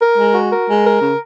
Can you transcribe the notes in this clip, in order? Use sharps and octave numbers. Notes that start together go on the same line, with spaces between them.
A#4
G#3
F#4
A#4
G#3
A#4
C#3